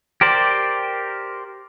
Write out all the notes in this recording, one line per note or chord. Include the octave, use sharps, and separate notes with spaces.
G4 A#4 C5 D5